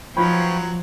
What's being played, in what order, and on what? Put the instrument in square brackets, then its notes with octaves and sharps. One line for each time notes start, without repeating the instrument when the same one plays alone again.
[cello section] F3 [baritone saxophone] F#3 [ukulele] D#4 F4 B5 [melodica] B4 C#5 G5